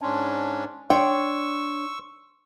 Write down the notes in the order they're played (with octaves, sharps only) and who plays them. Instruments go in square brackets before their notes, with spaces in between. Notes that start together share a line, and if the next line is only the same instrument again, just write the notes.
[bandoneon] G#2 C#4 D4 [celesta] A5 C6
[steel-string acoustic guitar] D4 C#5 [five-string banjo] G5 [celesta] C6 [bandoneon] C#6 E6